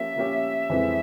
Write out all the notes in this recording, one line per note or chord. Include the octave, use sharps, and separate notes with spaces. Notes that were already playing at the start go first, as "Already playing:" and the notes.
Already playing: F3 A#3 C#4 G4 E5
F3 A#3 C#4 G4
F2 E3 G#3 C4 E4